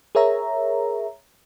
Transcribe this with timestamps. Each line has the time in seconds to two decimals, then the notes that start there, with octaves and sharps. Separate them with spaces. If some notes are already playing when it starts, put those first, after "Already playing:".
0.15 G#4 A#4 C#5 E5 A#5